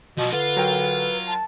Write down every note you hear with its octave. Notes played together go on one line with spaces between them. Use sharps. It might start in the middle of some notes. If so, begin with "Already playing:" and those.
B2 F3 F#3
D3 F4 B4
F#3 A#4 G5
A5